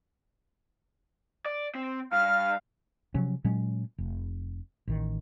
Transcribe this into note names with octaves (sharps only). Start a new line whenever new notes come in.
D5
C4
G2 F5 F6
C3 F3 F#3 C#4
A#2 F#3 G#3 C#4
F1
A1 D#3